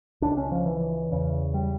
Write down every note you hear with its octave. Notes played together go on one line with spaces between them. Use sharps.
C#2 C#3 D4
C#4
F3
E3
E2 C#3
G3